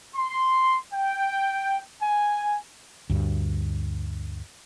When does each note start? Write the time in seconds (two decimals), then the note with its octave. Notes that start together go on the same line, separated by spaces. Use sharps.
0.16 C6
0.94 G5
2.02 G#5
3.10 D2 G2